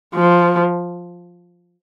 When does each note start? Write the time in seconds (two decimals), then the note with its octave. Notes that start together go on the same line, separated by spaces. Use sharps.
0.14 F3